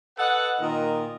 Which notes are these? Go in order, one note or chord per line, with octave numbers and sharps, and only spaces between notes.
A4 B4 D#5 F#5
A#2 D#3 A#4 D#5